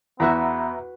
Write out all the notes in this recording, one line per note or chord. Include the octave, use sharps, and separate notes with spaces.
E2 B3 F#4 B4 E5 A#5 B5